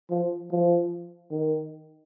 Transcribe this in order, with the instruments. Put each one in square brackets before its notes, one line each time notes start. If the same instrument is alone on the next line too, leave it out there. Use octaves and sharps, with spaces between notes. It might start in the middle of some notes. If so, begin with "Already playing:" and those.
[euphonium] F3
F3
D#3